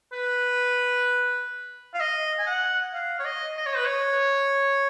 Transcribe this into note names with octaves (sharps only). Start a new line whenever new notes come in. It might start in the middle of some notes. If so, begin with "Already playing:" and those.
B4
F5
D#5
G#5
F#5
F5
C#5
D#5
D#5
C#5
B4
C#5